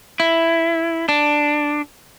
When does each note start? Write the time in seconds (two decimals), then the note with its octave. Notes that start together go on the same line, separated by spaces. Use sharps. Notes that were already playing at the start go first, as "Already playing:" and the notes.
0.20 E4
1.09 D4